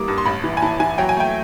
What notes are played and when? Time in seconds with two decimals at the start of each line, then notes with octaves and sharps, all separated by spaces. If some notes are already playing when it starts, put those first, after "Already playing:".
Already playing: E3 G3 A#3 D6 D#6
0.08 G2
0.18 C6
0.26 A1 B5
0.44 E3
0.57 G#5
0.62 E3 A5
0.80 E3 G#5
0.98 F#3 G5
1.09 G#5
1.17 A3 G5